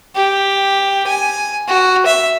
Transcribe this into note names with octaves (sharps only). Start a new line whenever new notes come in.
G4
G#5
F#4
E5